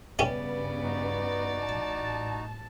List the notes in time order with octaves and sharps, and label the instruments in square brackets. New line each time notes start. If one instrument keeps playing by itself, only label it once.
[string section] G2 C#3 B3 [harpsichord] C#4 E4 G4 [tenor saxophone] D5
[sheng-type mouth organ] D#4 F#4
[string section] A1 A5